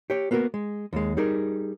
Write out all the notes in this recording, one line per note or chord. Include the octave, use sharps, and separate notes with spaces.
G4 C#5
A#3 B3 F#4 G#4 A#4
G#3
D#2 G#3
G3 D#4 G#4 A#4